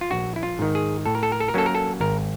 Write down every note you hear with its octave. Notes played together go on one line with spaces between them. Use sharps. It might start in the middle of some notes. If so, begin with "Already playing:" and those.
F4
A#1 F#4
E4
F4
G#2 D#3
G#4
A2 A4
A#4
A4
A#4
A4
A#4
F#3 A#3 C#4 A4
A#4
A4
G#1 A#4